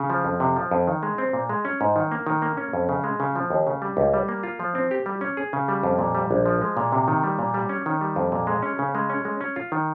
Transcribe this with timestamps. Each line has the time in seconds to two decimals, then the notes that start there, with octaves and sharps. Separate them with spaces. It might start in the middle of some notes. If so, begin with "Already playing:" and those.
Already playing: C#3
0.10 F3
0.25 F2
0.40 C3
0.56 F3
0.71 F2
0.87 D#3
1.03 G#3
1.18 C4
1.33 A#2
1.49 G#3
1.65 C#4
1.81 G#2
1.96 D#3
2.12 A#3
2.27 D#3
2.42 A#3
2.57 C#4
2.73 F2
2.89 C#3
3.04 G#3
3.20 C#3
3.36 F3
3.50 D#2
3.67 C#3
3.82 G3
3.97 C#2
4.14 G3
4.28 A#3
4.43 F4
4.60 F3
4.75 C4
4.91 G4
5.06 G3
5.21 C#4
5.37 G#4
5.53 C#3
5.68 G3
5.83 F2
5.99 A#2
6.15 G3
6.31 A#1
6.46 F3
6.61 G#3
6.77 A#2
6.92 C3
7.08 D#3
7.23 G3
7.39 A#2
7.54 G3
7.69 C#4
7.86 D#3
8.01 G3
8.16 F2
8.32 A#2
8.47 G#3
8.63 C#4
8.79 C#3
8.95 G#3
9.10 C#4
9.25 G#3
9.41 C#4
9.56 F4
9.72 D#3